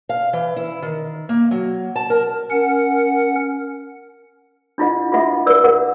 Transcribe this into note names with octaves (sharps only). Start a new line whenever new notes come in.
F5
E3
E4
D#3
A#3
F#3
A5
A#4
C#4 A#4 F#5
D4 E4 F4 D#5 F#5
F4 F#4 D#5 E5 F#5
A#4 B4 D5 E6
A#4 F#5